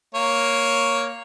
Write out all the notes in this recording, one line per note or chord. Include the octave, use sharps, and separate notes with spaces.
A#3 C#5